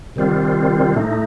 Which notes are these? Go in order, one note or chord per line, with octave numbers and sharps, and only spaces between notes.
C3 D#3 G3 C4 F4
A2 A3 D#4